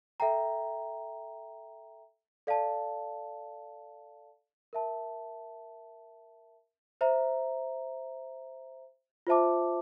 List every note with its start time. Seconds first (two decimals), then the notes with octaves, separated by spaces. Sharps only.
0.20 A4 E5 G5 A#5
2.47 A4 D5 F5 A5
4.73 A#4 E5 A5
7.01 C5 E5 A#5
9.27 F4 C5 E5 A5 D6